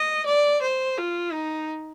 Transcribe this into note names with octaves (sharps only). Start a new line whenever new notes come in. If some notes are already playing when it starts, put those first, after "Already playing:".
Already playing: D#5
D5
C5
F4
D#4